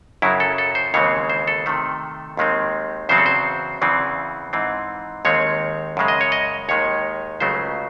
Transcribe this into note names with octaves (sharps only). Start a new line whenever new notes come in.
F#2 C#3 F#3 E4
A4
A4
C5
D#2 C#3 E3 G#3 C4 C#5
C5
A4
C3 D#3 A3
D#2 D#3 G#3 C4
E2 C#3 F#3 C4 C5
A4
C5
E2 C#3 E3 C4
G#2 E3 C4
D#2 D#3 G#3 C4 C#5
F#2 C#3 G#3
D#5
C#5
D#5
D#2 D#3 G#3 C#5
C#2 C#3 F#3 A3 C5